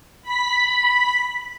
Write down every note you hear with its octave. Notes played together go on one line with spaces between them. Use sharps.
B5 B6